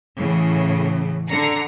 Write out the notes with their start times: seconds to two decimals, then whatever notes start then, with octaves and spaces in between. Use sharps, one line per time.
0.17 A2 C#3 E3
1.31 D3 A#5 C7 C#7